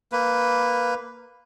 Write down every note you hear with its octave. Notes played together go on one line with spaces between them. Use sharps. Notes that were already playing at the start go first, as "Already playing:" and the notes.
A#3 B4